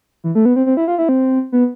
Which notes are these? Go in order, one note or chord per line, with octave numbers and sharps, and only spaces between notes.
E3
A3
B3
C4
C4
E4
F4
E4
C4
B3